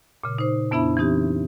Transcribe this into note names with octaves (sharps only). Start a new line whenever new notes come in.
A#2 C#3
D#4 C5
F2 B3 D4 E4 E5 B5
E3 C4 D#4 G4